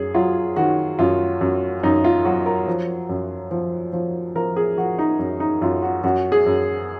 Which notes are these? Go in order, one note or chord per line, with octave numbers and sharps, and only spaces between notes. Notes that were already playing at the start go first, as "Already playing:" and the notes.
Already playing: F#2 G#4
F#3 F4
D#3 F#4
F#2 F4
F#2
F#2 D#4
F4
F#3 F#4
A#4
F3
F#2
F3
F3
F3 A#4
G#4
F3 F#4
D#4
F#2
D#4
F#2 F4
F#4
F#2 F#4
G#4
F#2